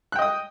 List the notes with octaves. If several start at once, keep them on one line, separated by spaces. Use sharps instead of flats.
D#5 G5 D#6 F#6